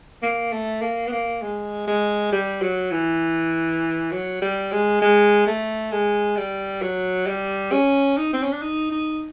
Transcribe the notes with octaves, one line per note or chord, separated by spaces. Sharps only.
A#3
A3
A#3
B3
A#3
G#3
G#3
G3
F#3
E3
F#3
G3
G#3
G#3
A3
G#3
G3
F#3
G3
C#4
D#4
C4
C#4
D4
D#4
D#4